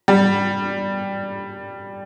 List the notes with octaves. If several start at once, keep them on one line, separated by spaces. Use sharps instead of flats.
G3